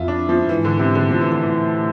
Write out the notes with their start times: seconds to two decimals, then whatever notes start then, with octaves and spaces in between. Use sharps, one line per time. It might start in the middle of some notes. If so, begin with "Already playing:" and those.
Already playing: F2 E4 F4
0.08 D4
0.29 F3
0.49 G#2 E3
0.65 D3
0.79 C3
0.95 D3
1.10 A2 F3
1.21 E3
1.32 D3
1.42 E3